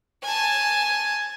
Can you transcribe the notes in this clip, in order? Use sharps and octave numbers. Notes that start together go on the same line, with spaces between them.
G#5 A5